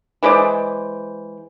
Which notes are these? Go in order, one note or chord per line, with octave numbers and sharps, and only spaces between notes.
E3 G#3 C5 D5